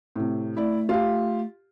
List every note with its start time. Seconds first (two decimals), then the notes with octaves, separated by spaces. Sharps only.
0.16 A2 C3
0.57 A3 E4 D5
0.89 F4 G4